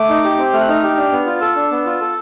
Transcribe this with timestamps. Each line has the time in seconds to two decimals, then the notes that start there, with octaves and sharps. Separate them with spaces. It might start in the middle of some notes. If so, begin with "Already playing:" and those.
Already playing: A3 D6
0.10 D#4
0.24 G4
0.38 C4
0.53 A3 F6
0.61 F#6
0.68 D#4 F6
0.83 G4
0.97 D4
1.12 B3
1.26 F4
1.41 A4 E6
1.56 D4
1.71 B3
1.86 F4
2.01 A4